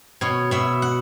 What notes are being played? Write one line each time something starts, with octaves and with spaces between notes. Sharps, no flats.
B2 C#5
B2 E5
F#5